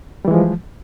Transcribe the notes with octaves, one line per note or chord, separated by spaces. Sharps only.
E3 F3 G3 G#3